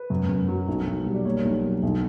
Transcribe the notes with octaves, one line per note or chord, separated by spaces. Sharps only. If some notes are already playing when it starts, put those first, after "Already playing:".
Already playing: B4
F#2
F#2
F#3
B1
B1
G3
D5
A#3 C#5
B1
F#3
B1